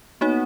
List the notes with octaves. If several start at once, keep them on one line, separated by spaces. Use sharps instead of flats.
A#3 B3 D#4 F#4 C#5